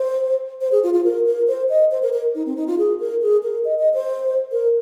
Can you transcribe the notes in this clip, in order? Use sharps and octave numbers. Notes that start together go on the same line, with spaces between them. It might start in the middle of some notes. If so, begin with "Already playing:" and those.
Already playing: C5
C5
G#4
F4
F4
A#4
A#4
C5
D#5
C5
A#4
A#4
D#4
C4
D#4
F4
G#4
A#4
G#4
A#4
D#5
D#5
C5
A#4